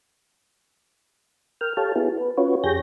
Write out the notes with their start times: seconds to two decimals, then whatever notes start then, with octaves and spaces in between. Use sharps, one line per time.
1.61 A#4 G5 F6
1.77 G4 A4 C#5 F5 A5
1.95 B3 E4 F#4 G#4
2.17 B4
2.38 C#4 F4 F#4 B4 C#5
2.64 F2 G4 G#4 C#5 G6 A#6